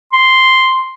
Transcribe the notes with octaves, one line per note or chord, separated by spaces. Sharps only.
C6